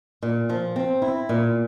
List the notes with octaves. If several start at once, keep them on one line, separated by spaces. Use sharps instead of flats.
A#2
F3
C4
E4
A#2